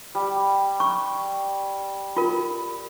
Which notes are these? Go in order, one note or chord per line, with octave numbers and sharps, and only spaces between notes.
G3
C#6
F4 A#4